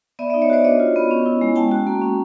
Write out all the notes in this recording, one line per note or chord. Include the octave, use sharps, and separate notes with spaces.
B3 D5 E5
D5 E5
D#4
C#5 D#5
F#4 C5 D5
D4 C#5 D#5
F4
B3
C#4
E4
G#3
C#4 G5 A5
F#4
A#3
C#4